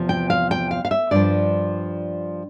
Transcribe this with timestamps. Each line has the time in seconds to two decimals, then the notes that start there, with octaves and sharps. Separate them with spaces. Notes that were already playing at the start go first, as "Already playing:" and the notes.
Already playing: E2 C3 F3
0.09 G5
0.30 F5
0.51 G5
0.71 F5
0.85 F5
0.91 E5
1.11 G2 F3 D5